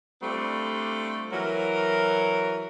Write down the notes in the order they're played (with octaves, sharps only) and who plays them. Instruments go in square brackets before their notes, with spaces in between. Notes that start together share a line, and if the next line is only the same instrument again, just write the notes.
[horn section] G3 A3 C4 D4 F4
E3 F#3 A#4